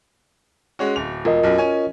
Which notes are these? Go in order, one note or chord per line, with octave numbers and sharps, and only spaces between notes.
G#3 C#4 F#4
D1 F7
E1 F4 A#4 D#5
B1 F#2
C#4 G#5